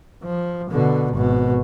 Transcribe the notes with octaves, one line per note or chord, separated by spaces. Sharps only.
F3
B2 D3
G#1 B2